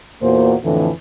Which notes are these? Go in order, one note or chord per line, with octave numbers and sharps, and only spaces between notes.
E2 A#2 A#3 F#4 C5
F2 A2 D3 E3